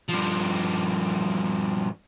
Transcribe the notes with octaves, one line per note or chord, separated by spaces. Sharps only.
G2 F3